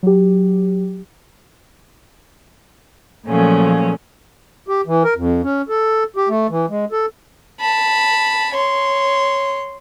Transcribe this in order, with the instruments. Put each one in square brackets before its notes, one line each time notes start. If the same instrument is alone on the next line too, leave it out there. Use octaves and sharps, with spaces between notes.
[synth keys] F#3 G4
[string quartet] A#2 F3 F#3 A3 C#4 G#4
[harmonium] G4
E3
A#4
F2
C#4
A4
G4
A3
E3
G#3
A4
[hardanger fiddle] A5 B5
C#5 C6